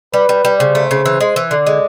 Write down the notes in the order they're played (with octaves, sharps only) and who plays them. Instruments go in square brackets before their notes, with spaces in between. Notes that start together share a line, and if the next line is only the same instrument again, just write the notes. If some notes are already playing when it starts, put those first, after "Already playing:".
[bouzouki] G3 [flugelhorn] B4
[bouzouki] G3
G3
[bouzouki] C#3 [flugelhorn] C5
[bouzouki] A3
C#3
E3
G#3
E3
[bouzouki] D3 [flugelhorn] D5
[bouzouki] G#3